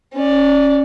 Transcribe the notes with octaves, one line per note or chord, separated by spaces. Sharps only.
C#4 D5